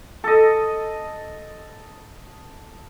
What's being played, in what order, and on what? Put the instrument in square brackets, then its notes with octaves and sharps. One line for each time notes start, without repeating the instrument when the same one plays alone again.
[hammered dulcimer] A4 D#5